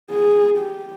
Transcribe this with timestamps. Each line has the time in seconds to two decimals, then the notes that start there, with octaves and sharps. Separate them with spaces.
0.11 G#4
0.58 G4